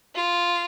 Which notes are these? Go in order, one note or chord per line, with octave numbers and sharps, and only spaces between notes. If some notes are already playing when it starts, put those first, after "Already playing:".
F4